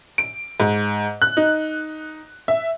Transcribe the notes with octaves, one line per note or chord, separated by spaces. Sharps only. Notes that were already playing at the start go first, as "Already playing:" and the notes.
D7
G#2
F#6
D#4
E5